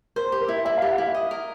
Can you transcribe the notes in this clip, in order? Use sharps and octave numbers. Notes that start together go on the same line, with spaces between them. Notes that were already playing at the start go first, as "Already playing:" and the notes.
A#4 C5
G4
A#4
E4
E4 E5
F5
G4
F#5
E4 F5
D#5
A#4